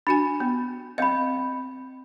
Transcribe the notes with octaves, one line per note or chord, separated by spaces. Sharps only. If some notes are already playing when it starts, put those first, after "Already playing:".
D4 F#4 G#5 B5
B3
C4 D#5 F5 B5